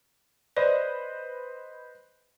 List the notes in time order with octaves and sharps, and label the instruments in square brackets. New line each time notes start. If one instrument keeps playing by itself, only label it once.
[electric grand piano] B4 C5 D#5 [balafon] D5